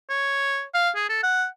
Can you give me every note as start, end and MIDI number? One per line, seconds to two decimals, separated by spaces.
0.10 0.63 73
0.74 0.90 77
0.96 1.09 68
1.09 1.20 69
1.23 1.46 78